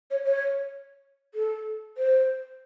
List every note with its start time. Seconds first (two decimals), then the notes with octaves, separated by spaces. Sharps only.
0.10 C#5
0.25 C#5
1.34 A4
1.97 C5